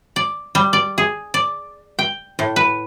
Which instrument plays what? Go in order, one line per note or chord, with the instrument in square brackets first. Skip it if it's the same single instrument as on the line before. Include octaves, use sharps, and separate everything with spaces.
[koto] D5
G3
D5
G#4
D5
G5
A2
B4